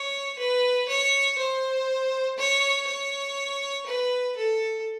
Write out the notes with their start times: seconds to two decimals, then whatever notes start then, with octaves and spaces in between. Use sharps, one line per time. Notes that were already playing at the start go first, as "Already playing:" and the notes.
Already playing: C#5
0.38 B4
0.88 C#5
1.38 C5
2.38 C#5
2.87 C#5
3.86 B4
4.36 A4